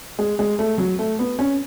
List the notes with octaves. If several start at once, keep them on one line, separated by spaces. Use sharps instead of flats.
G#3
G#3
A3
F#3
A3
B3
C#4